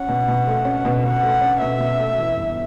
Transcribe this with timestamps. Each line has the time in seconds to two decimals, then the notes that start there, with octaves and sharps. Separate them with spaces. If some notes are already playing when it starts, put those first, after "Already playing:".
Already playing: C#4 F#5
0.08 B2
0.28 B2
0.47 A3
0.65 C#4
0.85 B2
1.04 B2 F#5
1.23 A3
1.41 C#4
1.61 B2 E5
1.79 B2
1.99 A3
2.18 E3
2.37 G1